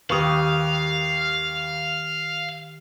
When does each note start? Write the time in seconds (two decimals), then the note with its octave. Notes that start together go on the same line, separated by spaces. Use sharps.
0.10 D#2 D#3 G4 B4 F5 C#6 D#6